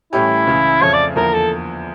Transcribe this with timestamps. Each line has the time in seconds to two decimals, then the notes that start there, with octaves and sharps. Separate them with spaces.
0.13 A2 E3 G3 C#4 E4 G4
0.47 C#2 C#3 E3
0.82 F2 C#3 F3 A3 C#5
0.93 D5
1.16 E2 D3 F3 A#3 E4 A#4
1.33 A4